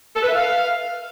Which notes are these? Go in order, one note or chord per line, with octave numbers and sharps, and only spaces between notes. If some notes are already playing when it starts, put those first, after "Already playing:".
A4
B4
E5
F5